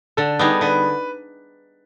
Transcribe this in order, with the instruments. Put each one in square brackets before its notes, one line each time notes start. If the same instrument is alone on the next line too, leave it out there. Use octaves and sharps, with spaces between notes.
[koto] D3 [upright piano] A4
[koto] G3 B3 D#4 G#4
[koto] D3 [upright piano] B4